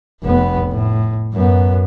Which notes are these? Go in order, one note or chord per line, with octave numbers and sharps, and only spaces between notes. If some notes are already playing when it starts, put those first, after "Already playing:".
F1 B3
A2
F#2 B3